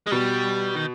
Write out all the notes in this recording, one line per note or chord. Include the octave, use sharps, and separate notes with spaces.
G#3
B2 G3
D#3